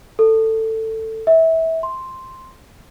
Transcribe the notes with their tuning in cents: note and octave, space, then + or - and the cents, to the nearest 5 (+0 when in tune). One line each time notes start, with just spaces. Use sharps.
A4 +15
E5 -25
C6 +0